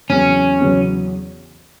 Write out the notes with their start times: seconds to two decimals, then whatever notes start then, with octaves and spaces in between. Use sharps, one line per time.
0.10 E2 C#3 F#3 B3 C#4
0.60 E2 C#3 F#3 B3